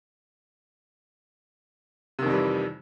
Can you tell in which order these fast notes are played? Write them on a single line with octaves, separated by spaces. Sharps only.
C3 D#3 F2 G3 E3